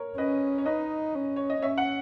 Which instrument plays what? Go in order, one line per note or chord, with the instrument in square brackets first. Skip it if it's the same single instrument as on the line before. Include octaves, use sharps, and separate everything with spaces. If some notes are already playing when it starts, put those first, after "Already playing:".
Already playing: [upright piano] A#4 C#5
[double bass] C#4 [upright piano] B4 D#5
[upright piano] C#5
[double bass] D#4 [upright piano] B4 D#5
[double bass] C#4
[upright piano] C#5
D#5
[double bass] C#4 [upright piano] C#5 E5
[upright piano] F#5